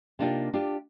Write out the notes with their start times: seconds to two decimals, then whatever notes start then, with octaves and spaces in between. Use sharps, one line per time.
0.19 C3 A#3 D4 D#4 F4 G4
0.54 D4 F4 G4